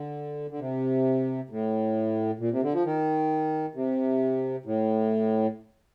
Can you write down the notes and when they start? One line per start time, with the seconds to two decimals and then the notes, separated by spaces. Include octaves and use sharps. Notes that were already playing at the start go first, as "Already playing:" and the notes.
Already playing: D3
0.50 D3
0.59 C3
1.50 A2
2.39 A#2
2.51 C3
2.63 D3
2.73 F3
2.85 D#3
3.75 C3
4.66 A2